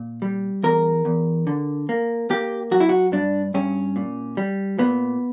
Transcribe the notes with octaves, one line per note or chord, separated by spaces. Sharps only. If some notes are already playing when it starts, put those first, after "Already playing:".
Already playing: A#2
G3
E2 A#4
E2
D3
A#3
A#3 G4
F#3 F#4
E4
F#4
G2 D4
G2 C#4
A#2
G3
A#2 B3